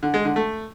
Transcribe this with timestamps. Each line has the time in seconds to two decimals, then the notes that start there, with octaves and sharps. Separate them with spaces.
0.03 D3
0.14 G#3
0.25 D3
0.36 A3